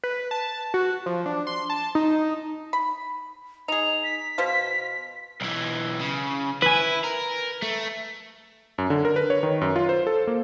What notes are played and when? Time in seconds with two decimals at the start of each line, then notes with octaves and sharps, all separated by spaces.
0.04 B4
0.31 A5
0.74 F#4
1.06 F3
1.26 D4
1.47 C6
1.70 A5
1.95 D#4
2.73 B5
3.68 D#4 G#4 F7
4.04 B6
4.38 B2 C5 F5
5.41 B1 E3
6.01 C#3
6.62 E4 B4 G#5
7.04 A#4
7.63 A3
8.78 F#2
8.90 D3
9.05 A#4
9.16 B4
9.30 C#5
9.43 D#3
9.61 F#2
9.76 F4
9.89 C5
10.07 A4
10.27 A#3